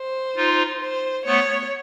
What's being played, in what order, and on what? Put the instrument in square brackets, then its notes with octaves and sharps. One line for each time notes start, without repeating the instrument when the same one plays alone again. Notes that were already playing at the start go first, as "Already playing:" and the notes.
Already playing: [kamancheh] C5
[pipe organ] D#4 F4
[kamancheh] C5
[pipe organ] A3 B3 [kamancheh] C#5